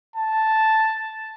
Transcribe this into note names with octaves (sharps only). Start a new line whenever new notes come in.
A5